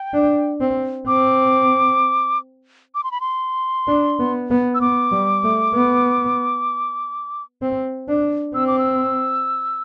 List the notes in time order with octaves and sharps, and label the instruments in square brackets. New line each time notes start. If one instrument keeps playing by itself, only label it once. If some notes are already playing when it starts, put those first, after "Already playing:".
Already playing: [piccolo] G5
[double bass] D4
C4
[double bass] C4 [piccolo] D6
[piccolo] D6
C6
B5
C6
[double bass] D4
B3
B3
[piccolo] E6
[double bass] B3 [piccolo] D6
[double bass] G3
A3
B3
C4
D4
[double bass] C4 [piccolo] E6
[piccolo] D6
E6